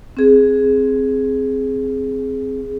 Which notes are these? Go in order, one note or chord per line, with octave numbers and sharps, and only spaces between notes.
C4 G#4